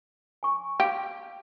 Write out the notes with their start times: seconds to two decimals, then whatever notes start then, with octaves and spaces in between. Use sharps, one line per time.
0.43 G#5 C#6
0.80 G4 F5